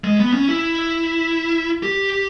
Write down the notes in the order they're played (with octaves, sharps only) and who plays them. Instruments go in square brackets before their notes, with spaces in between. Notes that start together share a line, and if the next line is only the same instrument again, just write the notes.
[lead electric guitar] G#3
B3
C#4
E4
G4